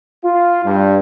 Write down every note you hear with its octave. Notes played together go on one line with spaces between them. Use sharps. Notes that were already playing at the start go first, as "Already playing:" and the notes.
F4
G2